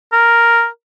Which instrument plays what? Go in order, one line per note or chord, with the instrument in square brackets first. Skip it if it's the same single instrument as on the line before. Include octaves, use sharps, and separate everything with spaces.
[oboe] A#4